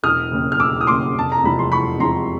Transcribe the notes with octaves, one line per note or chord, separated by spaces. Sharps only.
E1 D#6 F6
D#2 C#3
F6
E1 D6 E6
D#6
D#2 C#3 C6 D6
F1 A5
A#5
E2 C3 F3 G#3 B5
C6
F1 B5 C#6
E2 C3 F3 G#3 A#5 C6